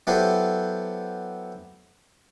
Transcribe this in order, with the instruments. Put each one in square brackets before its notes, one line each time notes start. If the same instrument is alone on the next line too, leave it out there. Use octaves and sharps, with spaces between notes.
[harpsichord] F#3 B3 E4 G4 A4 C5